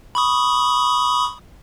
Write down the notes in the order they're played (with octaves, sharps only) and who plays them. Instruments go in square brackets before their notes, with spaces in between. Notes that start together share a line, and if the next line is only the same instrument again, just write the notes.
[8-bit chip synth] B5 C#6 D#6